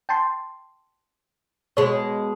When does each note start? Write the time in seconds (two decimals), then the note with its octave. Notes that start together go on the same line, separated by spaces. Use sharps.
0.09 G5 A5 C6
1.77 B2 G#3 C#5